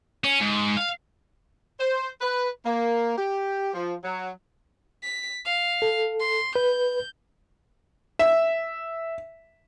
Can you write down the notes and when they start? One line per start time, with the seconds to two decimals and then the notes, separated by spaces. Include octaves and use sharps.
0.24 C#4
0.41 G#2
0.77 F5
1.80 C5
2.21 B4
2.65 A#3
3.17 G4
3.74 F3
4.04 F#3
5.03 B6
5.45 F5
5.82 A4
6.19 C6
6.56 B4 G6
8.19 E5